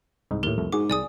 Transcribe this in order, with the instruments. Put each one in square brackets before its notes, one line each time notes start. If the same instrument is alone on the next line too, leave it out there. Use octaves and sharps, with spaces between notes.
[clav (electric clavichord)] C2 G#2 D#4
[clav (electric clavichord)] D#2 A2 [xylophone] G4 A#4
[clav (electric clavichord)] C2 F2 A3
[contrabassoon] G#2 [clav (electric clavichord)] F#4 G#4 [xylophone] D6
[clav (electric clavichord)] C2 G#4 [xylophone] D5 G#5 D#6